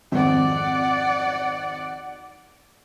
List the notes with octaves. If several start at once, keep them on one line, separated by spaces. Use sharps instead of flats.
G#1 F2 D5 F#5